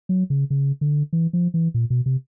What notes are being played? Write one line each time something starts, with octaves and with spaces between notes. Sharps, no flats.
F#3
C#3
C#3
D3
E3
F3
E3
A#2
B2
C3